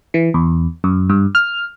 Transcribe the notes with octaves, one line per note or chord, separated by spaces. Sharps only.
E3
E2
F#2
G2
F6